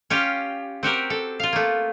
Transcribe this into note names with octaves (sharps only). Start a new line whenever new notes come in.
C#4 F4 G4
C4 F#4 G4 A#4
A4
F4 F5
A3 A#3